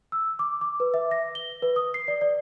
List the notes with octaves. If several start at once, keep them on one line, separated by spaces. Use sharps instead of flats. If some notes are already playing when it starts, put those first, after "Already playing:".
E6
D6
D6
B4
E5
A#6
G7
B4
D#6
C7
D5
D5